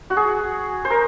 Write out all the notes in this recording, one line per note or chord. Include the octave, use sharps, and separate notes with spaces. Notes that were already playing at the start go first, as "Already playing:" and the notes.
F#4
G#4
C5
A#4